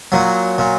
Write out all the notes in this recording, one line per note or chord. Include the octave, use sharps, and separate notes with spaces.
A#2 F#3
A#2